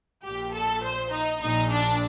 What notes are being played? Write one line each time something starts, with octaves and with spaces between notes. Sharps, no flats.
A#1 A#2 G4
A4
C5
D#4
A#1 A#2 D#4
D4